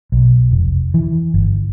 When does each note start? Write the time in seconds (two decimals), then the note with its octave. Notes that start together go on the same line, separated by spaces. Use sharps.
0.12 B1
0.51 F1
0.94 E3
1.34 G1